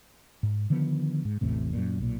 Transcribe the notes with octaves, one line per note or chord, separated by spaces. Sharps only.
G#2
D3 D#3 F3 B3
G#2
A1 E2 A2 C3
F#2 A#2
B1 A#2